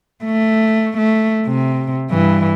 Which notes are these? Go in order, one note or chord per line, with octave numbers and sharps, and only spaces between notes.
A3
A3
C3
G2 E3